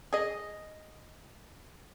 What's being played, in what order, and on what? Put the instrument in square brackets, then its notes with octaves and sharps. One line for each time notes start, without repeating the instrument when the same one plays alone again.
[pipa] G#4 D#5